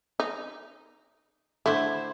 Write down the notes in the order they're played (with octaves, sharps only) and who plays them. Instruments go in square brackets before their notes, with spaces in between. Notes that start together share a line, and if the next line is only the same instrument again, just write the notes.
[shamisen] D#4
[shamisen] D3 A3 [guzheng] E4 C5